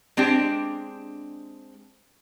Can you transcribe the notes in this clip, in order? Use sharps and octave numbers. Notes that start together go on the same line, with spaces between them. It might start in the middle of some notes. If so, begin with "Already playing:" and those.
G#3 C4 D4 G4